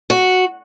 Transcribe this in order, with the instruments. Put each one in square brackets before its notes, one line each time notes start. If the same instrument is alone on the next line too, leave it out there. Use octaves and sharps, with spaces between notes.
[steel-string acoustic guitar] F#4